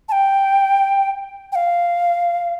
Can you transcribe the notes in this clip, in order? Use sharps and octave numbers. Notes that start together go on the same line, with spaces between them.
A5
G5
G5
F5